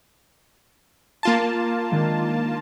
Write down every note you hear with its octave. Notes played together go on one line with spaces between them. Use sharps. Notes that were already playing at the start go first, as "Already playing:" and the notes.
A#3 F4 A5
D#3 G#3 D4